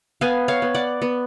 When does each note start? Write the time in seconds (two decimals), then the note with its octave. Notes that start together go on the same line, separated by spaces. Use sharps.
0.21 B3 F5 G#5
0.48 C#5 F5
0.62 B3
0.75 D5 F#5
1.02 B3